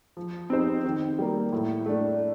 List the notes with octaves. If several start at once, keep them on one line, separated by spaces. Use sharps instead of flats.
F3
C4 D#4 G4 C5
D#3
G3 A#3
A2
A3 D4